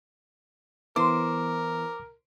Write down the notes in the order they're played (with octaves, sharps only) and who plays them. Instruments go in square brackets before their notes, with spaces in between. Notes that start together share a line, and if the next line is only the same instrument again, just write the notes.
[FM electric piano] E3 B3 E4 [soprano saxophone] A#4 [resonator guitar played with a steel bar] C5 [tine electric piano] D6